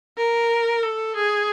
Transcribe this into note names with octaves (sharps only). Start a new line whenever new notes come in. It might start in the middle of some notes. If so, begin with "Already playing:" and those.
A#4
A4
G#4